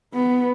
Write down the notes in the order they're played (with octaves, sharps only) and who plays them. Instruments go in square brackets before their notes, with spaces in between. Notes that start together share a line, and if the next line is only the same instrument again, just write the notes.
[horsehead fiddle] B3